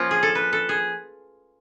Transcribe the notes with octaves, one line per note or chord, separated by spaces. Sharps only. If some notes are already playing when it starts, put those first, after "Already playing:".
Already playing: F3 A#3 C#4 F4
G#4
A4
B4
A4
G#4